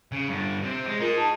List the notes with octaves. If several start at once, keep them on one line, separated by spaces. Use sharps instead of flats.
C#3
G2 D3
C3 C4
G#3
D#4 F4 G#4 A#4
A5